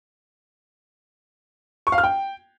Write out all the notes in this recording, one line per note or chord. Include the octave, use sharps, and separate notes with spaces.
C#6
F5
F6
G5